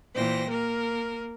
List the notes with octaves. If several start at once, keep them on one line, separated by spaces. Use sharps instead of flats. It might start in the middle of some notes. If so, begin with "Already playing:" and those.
A#2 E3 C5 G5 A#6
A#3 A#4